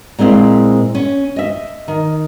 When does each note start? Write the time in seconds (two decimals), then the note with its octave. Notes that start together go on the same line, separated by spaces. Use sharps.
0.19 A#2 G#3 C4 E4 F5
0.95 C#4
1.36 D#5 E5
1.88 D#3